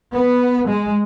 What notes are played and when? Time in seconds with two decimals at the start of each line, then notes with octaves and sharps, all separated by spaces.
0.13 B3
0.67 G#3